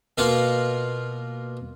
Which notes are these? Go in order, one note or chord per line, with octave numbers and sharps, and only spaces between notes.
B2 A#3 F4 F5